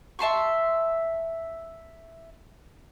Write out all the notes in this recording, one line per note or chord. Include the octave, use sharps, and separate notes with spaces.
E5 A5 C6 C#6